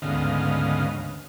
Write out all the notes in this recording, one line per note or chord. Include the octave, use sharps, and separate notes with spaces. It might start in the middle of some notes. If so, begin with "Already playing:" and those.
D2 G#2 C#3 B3 D#5 F5